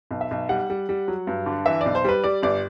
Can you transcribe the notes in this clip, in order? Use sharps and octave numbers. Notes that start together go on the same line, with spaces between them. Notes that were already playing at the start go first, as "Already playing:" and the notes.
B1
E5
B1
G3 F#5
G3
G3
F#3
G2
D3
E3 E5
B1 D5
C5
G3 B4
G3 D5
G1 D5